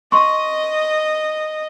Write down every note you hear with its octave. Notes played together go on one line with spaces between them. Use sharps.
D#5 C6 C#6